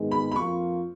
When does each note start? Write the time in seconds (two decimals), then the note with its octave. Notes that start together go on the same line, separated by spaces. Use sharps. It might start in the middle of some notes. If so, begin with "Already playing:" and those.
Already playing: G#2 D#3 G#3 B3
0.11 B5
0.32 B5
0.36 F2 F3 A#3 F4 C#6